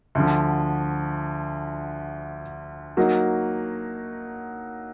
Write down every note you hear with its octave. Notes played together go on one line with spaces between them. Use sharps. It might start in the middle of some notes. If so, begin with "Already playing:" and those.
D2 D3 F3
F#3 A#3 D#4 F#4